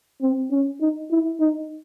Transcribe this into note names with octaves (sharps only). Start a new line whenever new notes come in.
C4
C#4
D#4
E4
D#4